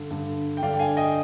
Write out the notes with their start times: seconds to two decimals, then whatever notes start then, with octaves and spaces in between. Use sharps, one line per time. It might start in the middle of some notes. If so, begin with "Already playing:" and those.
Already playing: G2 D3
0.10 G2 D3
0.57 G5
0.62 G2 D3 D5 F5
0.74 G5
0.79 F5 G#5
0.97 D#5 G5